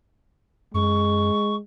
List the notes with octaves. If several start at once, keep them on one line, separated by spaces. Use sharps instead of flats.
F#2 G#3 C#6